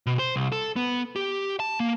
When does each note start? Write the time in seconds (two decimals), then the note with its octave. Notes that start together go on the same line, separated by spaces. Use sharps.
0.06 B2
0.19 C5
0.36 C2
0.52 A4
0.76 B3
1.16 G4
1.60 A5
1.80 A#3